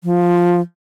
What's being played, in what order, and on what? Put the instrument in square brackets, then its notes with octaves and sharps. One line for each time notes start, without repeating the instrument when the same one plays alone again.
[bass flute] F3